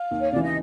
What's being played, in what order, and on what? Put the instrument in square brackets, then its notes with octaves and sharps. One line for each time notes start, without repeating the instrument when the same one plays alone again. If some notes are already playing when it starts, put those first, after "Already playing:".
Already playing: [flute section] F5
[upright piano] D#2
[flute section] C#5
[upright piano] C#3 E3 [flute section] D5
[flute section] D#5